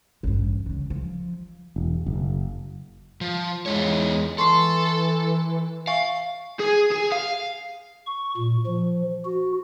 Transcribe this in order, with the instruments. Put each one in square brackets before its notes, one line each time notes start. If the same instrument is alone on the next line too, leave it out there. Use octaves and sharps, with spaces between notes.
[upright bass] A1 G2
D2 C#3
F3
[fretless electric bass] E1
F#1
[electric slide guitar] F3
[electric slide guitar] E2 E4 C#5 [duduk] G#3
[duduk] E3 [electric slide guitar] A4 [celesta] C6 C#6 C7
[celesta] E5 G#5 C#6 [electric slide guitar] F5
[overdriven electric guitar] G#4
G#4
F5
[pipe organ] C#6
A#2
F3
F#4